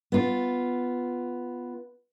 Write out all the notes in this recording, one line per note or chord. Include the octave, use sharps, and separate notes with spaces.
B3 F4